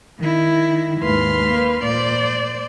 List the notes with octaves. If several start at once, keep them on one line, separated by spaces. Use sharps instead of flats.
D#3 E4
D#2 G#2 B4 C6 F6
A#3
A#2 C5 D5